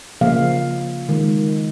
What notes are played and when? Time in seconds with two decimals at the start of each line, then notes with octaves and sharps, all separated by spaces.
0.21 C#3 F3 A#3 F5
1.09 D#3 G#3